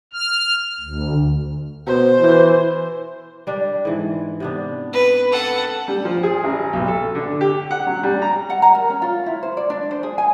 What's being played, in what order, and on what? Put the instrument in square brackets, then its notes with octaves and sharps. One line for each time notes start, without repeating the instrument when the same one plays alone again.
[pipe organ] F6
D2
[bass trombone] B2 [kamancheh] C5
[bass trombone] E3
[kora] G3 D4
G#2 E3
C3 B3 D4
[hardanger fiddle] B4
A4 F#5
[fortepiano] G3
F3
G#4
A1
B1
A4
D3
G4
F#5
F#3
G3
A#5
[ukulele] F#5
A#5
A#4
C#4
F4
E4
C5
D5
D4
C5
G#4
G#5